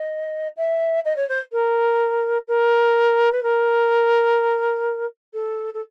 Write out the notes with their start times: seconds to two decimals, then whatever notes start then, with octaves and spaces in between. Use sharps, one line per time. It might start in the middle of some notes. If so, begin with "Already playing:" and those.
Already playing: D#5
0.57 E5
1.05 D#5
1.16 C#5
1.29 C5
1.52 A#4
2.48 A#4
3.32 B4
3.43 A#4
5.34 A4
5.74 A4